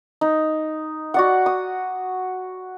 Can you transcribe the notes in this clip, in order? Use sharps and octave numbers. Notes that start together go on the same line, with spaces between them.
D#4
F#4 D5 F#5
D#6